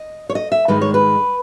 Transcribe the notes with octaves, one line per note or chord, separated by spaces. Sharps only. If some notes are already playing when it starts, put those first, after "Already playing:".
Already playing: D#5
C#5
D#5
E5
G#2 D#3 G#3 B4
C#5
B4